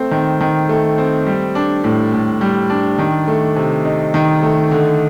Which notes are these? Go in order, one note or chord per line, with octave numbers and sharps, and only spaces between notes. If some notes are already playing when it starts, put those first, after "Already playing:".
Already playing: A3 C4
D#3
D#3
A3
C4
G3
D4
A2
A2
G3
D4
D#3
A3
C3
D#4
D#3
A3
D3